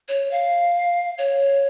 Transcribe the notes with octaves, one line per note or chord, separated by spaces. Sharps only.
C#5
F5
C#5